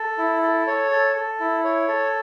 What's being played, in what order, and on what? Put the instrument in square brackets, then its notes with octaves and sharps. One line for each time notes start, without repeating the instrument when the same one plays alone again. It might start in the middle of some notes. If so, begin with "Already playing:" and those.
Already playing: [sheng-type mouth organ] A4
E4
A4
C#5
A4
A4
E4
C#5
A4